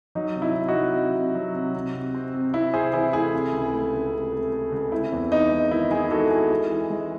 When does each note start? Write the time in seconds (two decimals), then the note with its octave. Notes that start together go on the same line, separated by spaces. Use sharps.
0.15 F#3 D#4
0.35 C3
0.42 E4
0.55 C3
0.68 D#4 F#4
0.75 F#3
0.95 C3
1.15 C3
1.35 F#3
1.54 C3
1.74 C3
1.94 C3
2.15 C4
2.34 C3
2.54 C3 E4
2.74 C3 G#4 C5
2.93 E3 E4 G#4
3.13 A3 E4 G#4
3.33 C3
3.53 C#2
3.73 A3
3.93 C#2
4.13 C3
4.32 A3
4.52 A3
4.72 C#2
4.92 C4 E4
5.12 E2
5.31 E2 D#4
5.51 G#3
5.71 D#3 E4
5.91 G#3 E4 G#4
6.11 D#3 F#4 A4
6.30 D#3 E4 G#4
6.51 G#3
6.71 E3
6.90 G#3